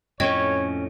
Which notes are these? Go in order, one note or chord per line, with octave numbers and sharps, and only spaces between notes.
F2 A2 C#4 C#5 D#5 G5 G#6